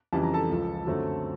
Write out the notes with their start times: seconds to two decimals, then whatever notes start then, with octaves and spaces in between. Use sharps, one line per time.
0.13 F2 C#3 E3 G3 A5
0.23 A#5
0.34 A4 A5
0.50 C#2 C#3 F3
0.87 F#2 D3 F#3 A3 C4